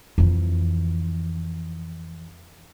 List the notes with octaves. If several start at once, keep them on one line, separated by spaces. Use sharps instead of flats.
F2 E3